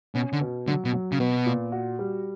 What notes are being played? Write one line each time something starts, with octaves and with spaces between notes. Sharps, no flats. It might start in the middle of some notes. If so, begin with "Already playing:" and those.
B2 C#4
D3
B2
D3 F#3
B2
F#3
C#3
B2 B3
A#2
F#4
G3